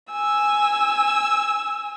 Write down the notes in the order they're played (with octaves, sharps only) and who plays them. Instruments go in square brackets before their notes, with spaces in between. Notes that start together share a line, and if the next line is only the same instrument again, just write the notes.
[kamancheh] G#5 E6